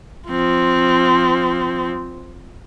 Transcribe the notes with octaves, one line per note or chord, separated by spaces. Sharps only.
F3 C4